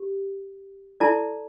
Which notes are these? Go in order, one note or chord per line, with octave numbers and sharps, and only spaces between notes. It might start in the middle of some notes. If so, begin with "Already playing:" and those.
Already playing: G4
E4 A4 D5 A5